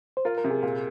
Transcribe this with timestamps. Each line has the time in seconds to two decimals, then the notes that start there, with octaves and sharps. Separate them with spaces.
0.17 C5
0.25 F4 A#4
0.38 A#4
0.44 C3
0.51 G#4
0.63 A#2